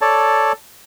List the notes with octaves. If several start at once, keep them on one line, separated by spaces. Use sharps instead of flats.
A4 C#5 D5 A5